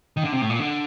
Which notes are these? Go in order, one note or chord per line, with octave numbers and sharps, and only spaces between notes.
D#3
D3
C3
A2
A#2
D3